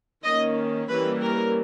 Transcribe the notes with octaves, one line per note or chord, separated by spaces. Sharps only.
D#3 A#3 C#4 D#5
E3 G3 A#3 C#4 B4
A#4